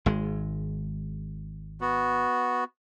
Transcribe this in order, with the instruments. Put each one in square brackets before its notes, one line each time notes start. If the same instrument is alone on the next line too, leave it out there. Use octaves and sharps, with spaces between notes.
[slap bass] G#1 G#3
[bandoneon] B3 F#4